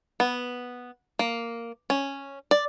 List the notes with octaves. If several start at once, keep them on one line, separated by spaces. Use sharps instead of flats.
B3
A#3
C#4
D5